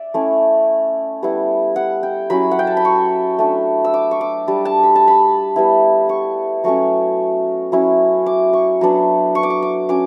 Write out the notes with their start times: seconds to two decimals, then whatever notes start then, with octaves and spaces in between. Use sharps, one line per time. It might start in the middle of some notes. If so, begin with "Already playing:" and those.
Already playing: D5 E5
0.14 A3 C#4 E4
1.23 G3 B3 E4
1.76 F#5
2.03 G5
2.30 F#3 C#4 E4 B5
2.51 F#5
2.59 G5
2.67 A5
2.77 B5
2.85 C#6
3.39 A3 D4
3.84 E6
3.94 D6
4.11 C#6
4.21 D6
4.47 G3 D4
4.65 A5
4.83 B5
4.96 A5
5.08 B5
5.56 G3 B3 E4
6.09 C#6
6.64 F#3 A3 C#4 C#6
7.72 F#3 C#4 E4
8.26 D6
8.53 C#6
8.81 F#3 B3 D4
9.35 C#6
9.43 D6
9.50 C#6
9.62 D6
9.89 F#3 C#4 D6